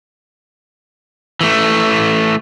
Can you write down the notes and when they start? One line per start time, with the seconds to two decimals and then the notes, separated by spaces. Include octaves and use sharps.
1.41 E3 A3